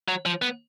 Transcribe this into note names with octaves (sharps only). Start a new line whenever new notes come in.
F#3
F3
B3